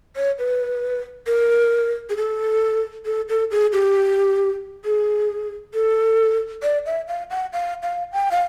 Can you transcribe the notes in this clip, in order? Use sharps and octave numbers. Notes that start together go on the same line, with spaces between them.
C#5
B4
A#4
G#4
A4
A4
A4
G#4
G4
G#4
A4
D5
E5
F5
F#5
F5
F5
G5
F5